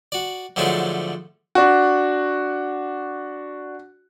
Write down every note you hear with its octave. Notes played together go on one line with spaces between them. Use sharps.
F#4 D5
G#2 D3 F3 F#3 A3 D4
D4 F#4